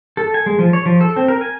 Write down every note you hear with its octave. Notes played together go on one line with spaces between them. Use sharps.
A4
G#5
G#3
F3
C#5
F3
A4
C4
A#4
G#5